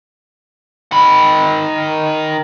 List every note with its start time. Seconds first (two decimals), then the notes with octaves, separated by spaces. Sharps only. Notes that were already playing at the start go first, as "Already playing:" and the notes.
0.92 D#3 B5